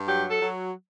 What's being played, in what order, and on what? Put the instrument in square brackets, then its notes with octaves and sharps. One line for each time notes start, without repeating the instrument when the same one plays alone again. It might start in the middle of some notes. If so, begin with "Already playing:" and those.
Already playing: [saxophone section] G2
F#3 G4
A4
F#3